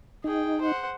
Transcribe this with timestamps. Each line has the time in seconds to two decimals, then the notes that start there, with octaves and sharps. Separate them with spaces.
0.24 D#4 G#4 G5
0.61 C5 F#5